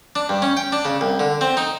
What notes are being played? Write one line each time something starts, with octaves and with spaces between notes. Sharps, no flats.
D4
G2
C#4
G5
D4
C#3
C2
D3
C4
D#4